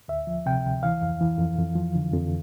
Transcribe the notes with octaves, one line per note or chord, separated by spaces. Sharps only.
D2 E5
F3
C3 G5
D2
E3 F5
F2
E3
F2
F2
F3
D3
F2